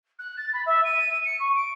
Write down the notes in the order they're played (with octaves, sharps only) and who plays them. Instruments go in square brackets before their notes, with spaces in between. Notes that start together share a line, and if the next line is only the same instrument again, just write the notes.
[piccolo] F#6
A6
B5
E5
D#7
C#7
C#6
D7